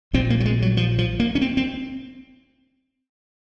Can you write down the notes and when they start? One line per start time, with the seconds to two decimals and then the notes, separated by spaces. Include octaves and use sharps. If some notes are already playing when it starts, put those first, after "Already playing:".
0.13 A#1 A#2 C4
0.30 A#3
0.40 F#3
0.45 G#3
0.62 F#3
0.77 F3
0.98 F3
1.20 A#3
1.35 C#4
1.41 C4
1.57 C4